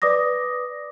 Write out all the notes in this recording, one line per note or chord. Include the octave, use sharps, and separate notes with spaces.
B4 D5 D6 D#6 A#6